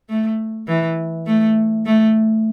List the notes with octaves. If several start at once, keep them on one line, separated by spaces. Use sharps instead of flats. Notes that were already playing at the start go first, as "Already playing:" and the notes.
A3
E3
A3
A3